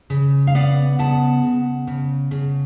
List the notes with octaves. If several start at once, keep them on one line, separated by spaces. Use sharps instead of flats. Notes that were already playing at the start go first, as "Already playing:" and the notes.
C#3
F5
B3 D5 F#5
C#3 F#5 A5
C#3
C#3
C#3